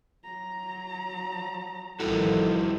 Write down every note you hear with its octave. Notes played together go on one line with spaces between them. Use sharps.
F#3 A#5
A1 D#3 F3 G3 E4 F#4 A4